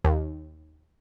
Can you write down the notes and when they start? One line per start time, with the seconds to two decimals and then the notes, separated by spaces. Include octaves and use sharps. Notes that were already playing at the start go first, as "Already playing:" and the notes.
0.04 D#2